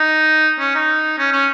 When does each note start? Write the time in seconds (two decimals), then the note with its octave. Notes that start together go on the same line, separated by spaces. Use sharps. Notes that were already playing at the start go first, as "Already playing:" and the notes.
Already playing: D#4
0.59 C#4
0.75 D#4
1.18 C#4
1.32 C#4